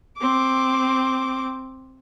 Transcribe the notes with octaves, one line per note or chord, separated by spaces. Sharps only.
C4 D6